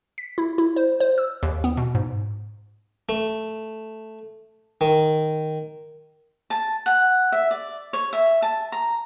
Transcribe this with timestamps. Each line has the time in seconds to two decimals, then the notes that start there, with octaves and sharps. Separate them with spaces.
0.18 B6
0.38 E4
0.58 E4
0.76 C5
1.00 C5
1.18 E6
1.43 D#2
1.64 B3
1.77 B2
1.95 G#2
3.09 A3
4.81 D#3
6.50 A5
6.86 F#5
7.32 E5
7.51 D5
7.93 C#5
8.13 E5
8.42 A5
8.72 A#5